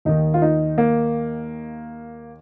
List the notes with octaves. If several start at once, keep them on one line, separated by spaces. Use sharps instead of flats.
D#2 D#3 D#4
F4
D#4
A#3